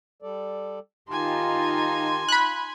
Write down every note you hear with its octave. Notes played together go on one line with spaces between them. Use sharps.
G3 A4 D5
D#3 D#4 F4 G4 G#5 A5 C6
B5 F#6